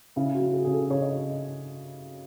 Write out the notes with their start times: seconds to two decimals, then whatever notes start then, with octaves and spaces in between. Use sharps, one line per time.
0.16 C#3 E4
0.35 F#4
0.41 F#3
0.53 G#4
0.65 C#3 G#4
0.72 A4
0.90 C#3 C#5
1.02 D#5